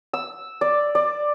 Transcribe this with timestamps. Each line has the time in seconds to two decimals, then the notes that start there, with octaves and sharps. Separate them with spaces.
0.13 E6
0.61 D5
0.95 D5